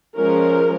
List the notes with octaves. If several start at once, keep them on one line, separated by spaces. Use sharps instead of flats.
F3 G#3 C#4 A#4